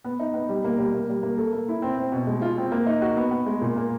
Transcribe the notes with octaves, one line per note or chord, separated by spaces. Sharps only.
B3
D#4
B3
G3
A#3
G3
A#3
G3
A#3
A4
A#3
E4
C4
C4
B2
G#3
F4
C4
A#3
D#4
F#4
B3
B3
G#3
A#2
A#3